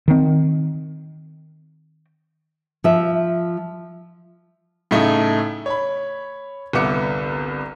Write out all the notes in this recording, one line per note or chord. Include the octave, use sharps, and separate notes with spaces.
D#3 C4
F3 E5
A2 C#3 A3 D#4
C#5 B5
G1 C2 B3 E5 D6 C#7